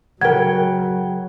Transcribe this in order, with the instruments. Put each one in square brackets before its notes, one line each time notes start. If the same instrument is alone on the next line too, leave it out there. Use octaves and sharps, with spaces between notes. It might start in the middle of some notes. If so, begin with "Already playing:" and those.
[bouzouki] C#3 G5 [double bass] F#3 [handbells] A#4 G#6 [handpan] F#5